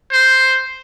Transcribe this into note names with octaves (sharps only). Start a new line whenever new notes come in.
C5